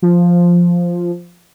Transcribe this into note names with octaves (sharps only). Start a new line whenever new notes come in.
F3